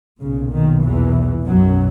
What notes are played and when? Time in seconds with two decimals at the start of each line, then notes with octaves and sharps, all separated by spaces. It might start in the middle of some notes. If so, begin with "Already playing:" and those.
0.20 B1 A#2 C#3
0.52 D#3
0.84 E2 E3
1.47 B1 F#2 B2 F#3